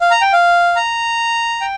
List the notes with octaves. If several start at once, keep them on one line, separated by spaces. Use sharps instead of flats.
F5
A#5
G5
F5
A#5
G5